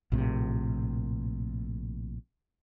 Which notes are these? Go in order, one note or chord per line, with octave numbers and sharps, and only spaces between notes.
A#1 A2 C3